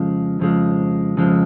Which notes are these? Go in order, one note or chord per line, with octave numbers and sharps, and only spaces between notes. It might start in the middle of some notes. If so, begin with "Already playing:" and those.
Already playing: F2 C#3 F3 G#3
F2 C#3 F3 G#3
F2 C#3 F3 G#3